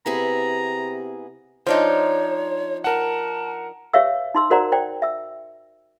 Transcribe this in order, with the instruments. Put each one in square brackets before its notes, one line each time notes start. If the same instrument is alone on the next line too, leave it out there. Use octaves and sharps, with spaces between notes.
[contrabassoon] C3 [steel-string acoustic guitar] B3 E4 G#4 [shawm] A#5
[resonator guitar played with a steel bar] F3 D4 D#4 [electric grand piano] C5 [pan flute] C#5
[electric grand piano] A#4 F#5 [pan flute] A5
[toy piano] G4 B4 C#5 E5 F5 E6
D#4 C6 E6
F#4 A#4 C5 D5 F#5 A#5
C5 D5 G5
E5 E6